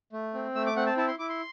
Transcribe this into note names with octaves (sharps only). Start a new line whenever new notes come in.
A3
C4
A3 E6
D6
C4 F#5
A5
E4 A5
C6
E4 D6
C6